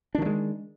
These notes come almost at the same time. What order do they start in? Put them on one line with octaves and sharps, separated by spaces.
D4 D#3 F3 G#3